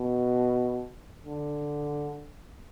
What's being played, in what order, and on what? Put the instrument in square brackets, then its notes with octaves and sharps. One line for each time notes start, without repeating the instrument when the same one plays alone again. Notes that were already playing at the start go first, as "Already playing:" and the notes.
Already playing: [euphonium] B2
D3